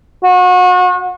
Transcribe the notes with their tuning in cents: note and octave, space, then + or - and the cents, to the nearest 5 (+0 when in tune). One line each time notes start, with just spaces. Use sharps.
F#4 -35